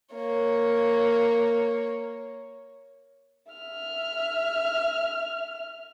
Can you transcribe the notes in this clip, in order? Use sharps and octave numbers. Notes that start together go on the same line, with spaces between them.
A#3 C#5
E5 F6